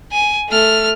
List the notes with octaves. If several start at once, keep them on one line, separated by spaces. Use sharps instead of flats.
G#5
A3 F6